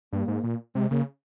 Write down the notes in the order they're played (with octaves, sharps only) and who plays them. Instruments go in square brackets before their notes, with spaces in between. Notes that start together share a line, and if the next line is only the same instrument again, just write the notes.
[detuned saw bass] G2 [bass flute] A#3
[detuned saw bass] G#2
A#2
[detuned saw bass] C3 [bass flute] G#3
[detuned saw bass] C#3 [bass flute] A#3